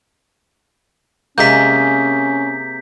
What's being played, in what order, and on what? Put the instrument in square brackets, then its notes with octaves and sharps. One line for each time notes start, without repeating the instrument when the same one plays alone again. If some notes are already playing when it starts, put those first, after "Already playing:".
[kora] C3 G#3 A#3 [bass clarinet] C#4 [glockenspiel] G6 B6